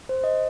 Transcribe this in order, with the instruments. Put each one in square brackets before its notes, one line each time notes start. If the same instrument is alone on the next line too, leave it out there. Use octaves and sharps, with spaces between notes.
[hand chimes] C5
D#5